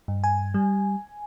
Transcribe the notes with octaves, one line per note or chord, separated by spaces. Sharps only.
G2
G#5
G3